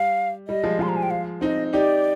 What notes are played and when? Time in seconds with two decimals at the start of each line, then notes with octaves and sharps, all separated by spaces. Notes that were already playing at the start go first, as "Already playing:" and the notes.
Already playing: G3 F5
0.48 G3 D#5
0.63 F3 G#3
0.79 F3 G#3 C6
0.89 A#5
0.96 G#5
1.03 G5
1.11 F5
1.41 C4 D#4 D#5
1.73 D#4 G4 D5